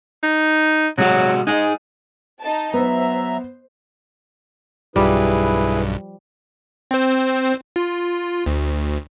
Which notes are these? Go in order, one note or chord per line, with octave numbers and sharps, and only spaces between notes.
D#4
C3 F#3 G#3 F#4
G#3 D#4 G#4
D#4 A5
F#3 B3 C5 E5 A#5
B1 G2 F3 G3 E4 G#4 B4
C4 C5
F4
D2